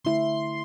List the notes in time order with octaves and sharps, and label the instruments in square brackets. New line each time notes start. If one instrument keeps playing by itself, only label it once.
[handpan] D3 A3 E4 [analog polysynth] C6